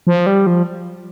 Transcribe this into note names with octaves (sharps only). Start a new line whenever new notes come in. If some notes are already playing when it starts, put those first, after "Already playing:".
F3
G3
F3